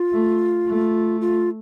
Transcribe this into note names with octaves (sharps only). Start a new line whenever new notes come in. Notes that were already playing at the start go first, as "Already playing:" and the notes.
Already playing: F4
A3
A3
F4